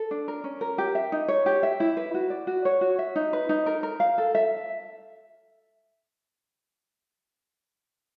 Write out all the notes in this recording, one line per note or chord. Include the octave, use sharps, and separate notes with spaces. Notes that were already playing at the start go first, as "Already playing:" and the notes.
Already playing: A4
D4
A#4
C#4
A#4
G4
E5
D#4
C#5
G4
E5
E4
B4
F#4
D5
F#4
C#5
F#4
E5
D#4
B4
D#4
A#4
A#4
F5
A4
E5